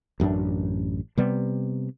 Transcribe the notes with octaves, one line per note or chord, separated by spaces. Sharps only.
A1 F#2 C4 D4
C3 G3 B3